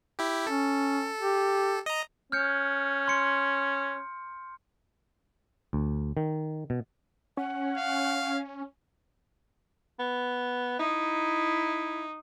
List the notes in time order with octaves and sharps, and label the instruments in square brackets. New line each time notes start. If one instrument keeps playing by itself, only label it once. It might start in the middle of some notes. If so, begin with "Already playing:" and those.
[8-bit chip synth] E4 G4
[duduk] C#4 [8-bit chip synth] A4
[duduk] G4
[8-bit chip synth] D#5 A#5
[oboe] C#4 [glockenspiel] F6 G6 C#7
[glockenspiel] C6 C#7
[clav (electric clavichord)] D2
D#3
B2
[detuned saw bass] C#4 [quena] F#5
[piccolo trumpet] F5
[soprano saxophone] B3
[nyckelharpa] D#4 [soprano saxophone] E4